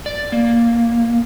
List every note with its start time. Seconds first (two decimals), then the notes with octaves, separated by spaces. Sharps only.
0.06 D5
0.32 A#3